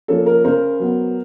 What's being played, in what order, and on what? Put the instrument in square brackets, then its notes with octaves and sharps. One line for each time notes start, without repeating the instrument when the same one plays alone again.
[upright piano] F3 A#3 C#4 A4
A#4
C#3 A#4 C5
F#3 B3